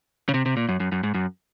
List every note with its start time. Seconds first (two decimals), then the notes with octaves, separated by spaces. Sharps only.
0.29 C#3
0.34 C3
0.46 C3
0.57 A#2
0.69 F#2
0.80 F#2
0.92 F#2
1.04 G#2
1.14 F#2